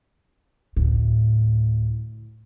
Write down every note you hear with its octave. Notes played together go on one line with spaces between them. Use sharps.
D2 A2